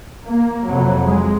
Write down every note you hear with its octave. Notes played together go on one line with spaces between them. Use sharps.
A#3
F2 C3 F#3
G#3